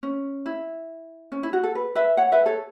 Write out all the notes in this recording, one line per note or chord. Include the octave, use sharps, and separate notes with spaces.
C#4
E4
C#4
E4
F#4
A4
B4
B4 E5
C#5 F#5
B4 E5
A4 C#5